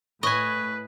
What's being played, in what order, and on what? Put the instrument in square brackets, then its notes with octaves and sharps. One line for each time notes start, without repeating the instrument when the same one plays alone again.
[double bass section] A2 [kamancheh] B4 [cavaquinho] C#5 [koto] D#5 G#5